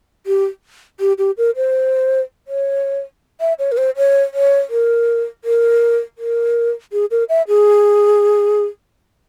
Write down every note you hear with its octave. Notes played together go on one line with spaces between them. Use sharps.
G4
G4
G4
A#4
C5
C#5
E5
C#5
A#4
C5
C#5
C#5
A#4
A#4
A#4
G#4
A#4
E5
G#4